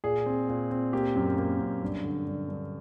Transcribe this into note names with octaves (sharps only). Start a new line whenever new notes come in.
A#2 G#4
C4
A#2
C4
A#3 G4
F#2
A#3
F#2
G2
D3
G2
G2